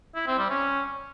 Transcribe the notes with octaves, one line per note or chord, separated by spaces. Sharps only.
E4
C4
G3
C#4